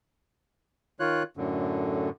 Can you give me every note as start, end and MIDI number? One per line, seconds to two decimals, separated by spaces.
1.00 1.23 51
1.00 1.23 65
1.00 1.23 73
1.00 1.23 90
1.37 2.10 42
1.37 2.10 45
1.37 2.10 50